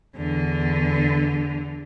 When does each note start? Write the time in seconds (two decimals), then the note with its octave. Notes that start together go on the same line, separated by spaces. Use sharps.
0.16 E2 D3